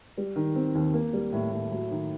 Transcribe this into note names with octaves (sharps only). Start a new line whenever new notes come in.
G3
D#3
C4
D#2
A#3
G3
A2
A2
F#3
D#3